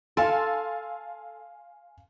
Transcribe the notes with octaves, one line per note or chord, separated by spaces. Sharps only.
A4 F5 G#5 C6